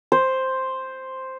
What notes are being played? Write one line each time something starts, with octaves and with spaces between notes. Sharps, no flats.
C5